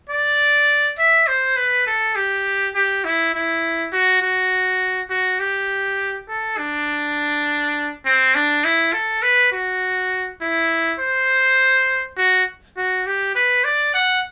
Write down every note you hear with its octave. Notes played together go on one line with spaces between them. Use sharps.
D5
E5
C5
B4
A4
G4
G4
E4
E4
F#4
F#4
F#4
G4
A4
D4
C4
D4
E4
A4
B4
F#4
E4
C5
F#4
F#4
G4
B4
D5
F#5